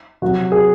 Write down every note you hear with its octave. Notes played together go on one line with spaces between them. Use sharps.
C3 F#3 F#4
G#4